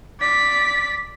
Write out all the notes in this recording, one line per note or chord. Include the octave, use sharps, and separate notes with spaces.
D5 B6